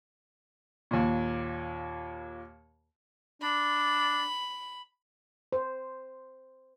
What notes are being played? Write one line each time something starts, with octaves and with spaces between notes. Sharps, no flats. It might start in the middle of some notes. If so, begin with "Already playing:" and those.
D#2 A#2
D4 B5
C5